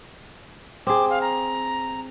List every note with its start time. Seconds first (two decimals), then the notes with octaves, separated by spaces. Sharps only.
0.87 C4 G#4 D6
1.10 F5
1.21 A#5